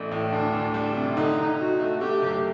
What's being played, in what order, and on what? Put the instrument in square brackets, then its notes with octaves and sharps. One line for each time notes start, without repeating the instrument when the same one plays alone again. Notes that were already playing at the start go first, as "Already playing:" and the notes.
Already playing: [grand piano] A1 A3 D4
A2
[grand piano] D2 [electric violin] D4
[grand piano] D2
[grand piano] G3 [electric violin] D4
[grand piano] C3
[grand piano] D3 [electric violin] D#4
[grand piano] D3
[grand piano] D#4 [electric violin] F#4
[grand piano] A3
[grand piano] A3 [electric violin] G4
[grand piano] F#1